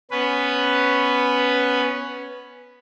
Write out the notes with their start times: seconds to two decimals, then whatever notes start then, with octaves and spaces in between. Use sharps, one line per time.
0.11 B3 C#4 B4